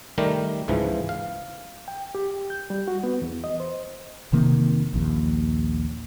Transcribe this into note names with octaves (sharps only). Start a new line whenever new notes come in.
D#3 G3 A3 G4 A#4
C#2 G#2 E3 F3
F5
G5
G4
G6
G3
F#4
B3
E2
D#5
C5
F1 C3 D#3 A#3
A#1 D#2